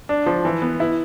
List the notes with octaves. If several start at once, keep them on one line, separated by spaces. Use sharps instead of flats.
D4
F3
E3
B3
E4